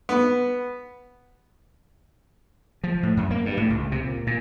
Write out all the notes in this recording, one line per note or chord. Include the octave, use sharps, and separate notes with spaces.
B3
F3
A2
F#2
A#3
G2
A2
C#2
C3
A#2
A#2